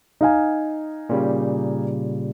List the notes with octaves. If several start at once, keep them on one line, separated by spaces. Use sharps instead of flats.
D#4 F5 G#5
A#2 C#3 G3